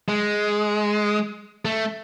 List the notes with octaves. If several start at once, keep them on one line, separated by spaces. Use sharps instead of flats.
G#3
A3